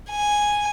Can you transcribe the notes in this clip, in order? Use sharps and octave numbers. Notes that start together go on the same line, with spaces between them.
G#5